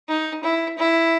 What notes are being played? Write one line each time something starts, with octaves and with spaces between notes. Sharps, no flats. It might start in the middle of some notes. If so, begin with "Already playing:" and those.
D#4
E4
E4